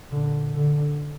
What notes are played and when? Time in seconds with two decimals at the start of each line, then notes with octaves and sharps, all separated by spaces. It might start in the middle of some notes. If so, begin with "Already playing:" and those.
0.12 A#2 D3
0.57 D3